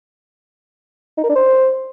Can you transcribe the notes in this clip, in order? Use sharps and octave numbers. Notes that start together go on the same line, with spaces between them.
D#4
A#4
D4
C5